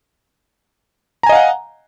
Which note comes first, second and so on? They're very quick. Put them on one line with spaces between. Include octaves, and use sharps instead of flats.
A#5 G#5 D#5 F5 F#5